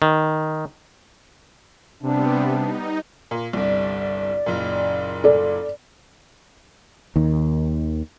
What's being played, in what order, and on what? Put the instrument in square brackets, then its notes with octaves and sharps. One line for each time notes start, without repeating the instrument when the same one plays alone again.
[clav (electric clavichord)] D#3
[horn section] C3 [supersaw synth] G3 B3 [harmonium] D4
[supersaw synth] D#4
[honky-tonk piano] A#2
[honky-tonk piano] G1 C2 [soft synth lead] D5
[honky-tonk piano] F#1 A#2
[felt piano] A4 D5
[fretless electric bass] D#2 D#3